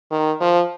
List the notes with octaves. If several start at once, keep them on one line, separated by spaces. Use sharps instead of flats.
D#3
F3